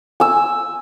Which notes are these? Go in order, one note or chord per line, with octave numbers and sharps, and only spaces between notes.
G#5 E6